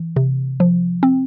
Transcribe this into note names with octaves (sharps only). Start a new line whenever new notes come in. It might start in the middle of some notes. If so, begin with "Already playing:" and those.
Already playing: E3
C3
F3
C4